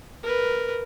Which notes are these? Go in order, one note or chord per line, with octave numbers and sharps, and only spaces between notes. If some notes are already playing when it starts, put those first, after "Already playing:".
A#4 B4